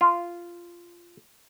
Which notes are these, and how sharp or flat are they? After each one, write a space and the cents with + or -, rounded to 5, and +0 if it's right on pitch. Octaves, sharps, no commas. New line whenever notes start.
F4 -10